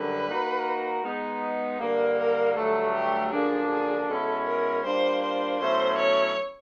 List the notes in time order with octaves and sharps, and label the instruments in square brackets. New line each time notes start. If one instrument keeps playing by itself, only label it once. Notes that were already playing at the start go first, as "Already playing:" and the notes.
Already playing: [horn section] F#2 D3 G3 [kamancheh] B4
[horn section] A#3 D#4 F#4 A#4
G#3 B3 D#4
[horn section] G2 D3 G3 A#3 [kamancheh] A#4
[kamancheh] A#4
[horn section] G2 D3 F#3 A3 [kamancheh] A4
[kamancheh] G4
[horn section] F#2 D3 F3 A#3 D4 [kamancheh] G#4
[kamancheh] G#4
[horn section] B2 G#3 C#4 E4 [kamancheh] A4
[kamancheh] A#4
[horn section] G3 A#3 D4 F4 [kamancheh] C5
[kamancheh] C5
[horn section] B2 F#3 A3 C#4 E4 [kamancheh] C5
[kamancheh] C#5